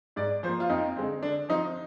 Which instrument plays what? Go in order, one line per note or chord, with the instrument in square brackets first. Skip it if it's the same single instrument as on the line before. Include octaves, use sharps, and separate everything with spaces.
[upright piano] G#2 D5
F3 C5
A#3
F4
F2 D#4
D3 G#3 C4
D3 D4
F3 C4 D#4